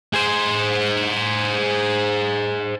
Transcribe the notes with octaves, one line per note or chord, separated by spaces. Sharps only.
G#4 C5